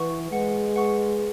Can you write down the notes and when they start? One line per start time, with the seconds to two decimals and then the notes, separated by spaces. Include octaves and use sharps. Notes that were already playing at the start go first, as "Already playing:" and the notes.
Already playing: E3 B4 F#5 C#6
0.31 G#3 B4 F#5 C#6
0.75 B4 F#5 C#6